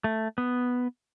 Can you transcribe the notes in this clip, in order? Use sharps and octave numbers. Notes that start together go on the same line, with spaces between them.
A3
B3